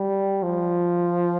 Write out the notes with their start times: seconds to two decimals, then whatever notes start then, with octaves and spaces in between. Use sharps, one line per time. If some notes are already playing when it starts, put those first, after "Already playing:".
Already playing: G3
0.43 F3